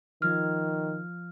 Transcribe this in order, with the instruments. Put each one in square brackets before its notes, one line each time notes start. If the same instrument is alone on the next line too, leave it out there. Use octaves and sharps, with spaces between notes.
[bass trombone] D#3 [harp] F3 G#6 A#6 [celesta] F6